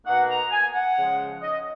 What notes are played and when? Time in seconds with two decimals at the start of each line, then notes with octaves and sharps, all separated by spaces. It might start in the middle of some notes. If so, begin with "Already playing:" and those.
0.05 B2 A#3 D#4 F#5
0.28 A#5
0.51 G#5
0.73 F#5
0.97 C#3 F3 G#3
1.41 D#5